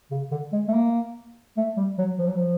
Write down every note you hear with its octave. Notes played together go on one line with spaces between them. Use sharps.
C#3
D3
G#3
A3
A#3
A3
G3
F#3
F3
F#3
F3